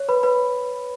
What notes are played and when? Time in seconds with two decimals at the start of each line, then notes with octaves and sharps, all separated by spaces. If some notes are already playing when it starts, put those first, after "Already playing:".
Already playing: C#5
0.09 B4 B5
0.23 B4 B5